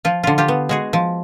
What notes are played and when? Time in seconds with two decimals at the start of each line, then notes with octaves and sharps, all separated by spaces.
0.05 F3 F4
0.24 D3 F4
0.38 F4 G4
0.48 B3
0.69 G#3 F#4 G#4
0.93 F3